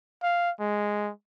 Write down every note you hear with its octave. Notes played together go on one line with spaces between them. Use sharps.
F5
G#3